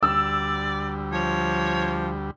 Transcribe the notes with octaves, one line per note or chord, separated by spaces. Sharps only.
D2 G3 D5 E6
F3 C#5